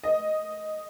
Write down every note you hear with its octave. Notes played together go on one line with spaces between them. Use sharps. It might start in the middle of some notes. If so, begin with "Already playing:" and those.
D#5